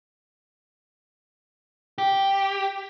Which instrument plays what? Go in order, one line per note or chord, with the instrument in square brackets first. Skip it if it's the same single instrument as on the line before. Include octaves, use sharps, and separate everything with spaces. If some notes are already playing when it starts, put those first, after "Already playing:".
[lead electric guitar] G4